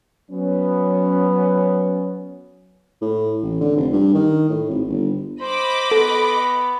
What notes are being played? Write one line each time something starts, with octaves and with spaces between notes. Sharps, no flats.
F#3 B3 C#4
A2
A1
D3
F1
G2
D#3
A2
G#1
G1
C5 D#5 B5 D6
B3 A4